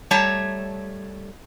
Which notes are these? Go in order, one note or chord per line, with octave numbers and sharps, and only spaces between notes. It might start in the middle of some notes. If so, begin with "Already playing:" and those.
G3 A3 C#5 A5 A#5